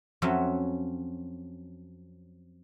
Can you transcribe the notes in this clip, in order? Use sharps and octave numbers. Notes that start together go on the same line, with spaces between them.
F2 F#3 C#4 E5